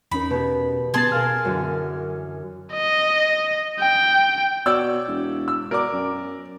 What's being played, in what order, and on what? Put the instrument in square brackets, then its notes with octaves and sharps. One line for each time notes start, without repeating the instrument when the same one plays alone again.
[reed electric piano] E2 C#4 [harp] D#4 A#4 [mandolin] B5
[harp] B2 G4
[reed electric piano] B2 B3 A6 [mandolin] G#4 A5 C6
[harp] A#4 F5 [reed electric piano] F6
[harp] F#2 D3 E3
[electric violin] D#5
G5
[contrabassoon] B2 [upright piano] C#5 D5 E6
[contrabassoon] E1
[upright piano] E6
[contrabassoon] B2 [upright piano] A#4 D5 D6
[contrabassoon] F#2